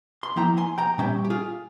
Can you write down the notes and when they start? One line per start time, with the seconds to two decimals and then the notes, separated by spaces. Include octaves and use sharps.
0.23 C6
0.36 F3 A#3 E4 G5 A#5
0.58 G#5 C6
0.78 G5 A#5
0.98 A#2 G3 C#4 E5 G5
1.25 G4
1.30 F4 G#4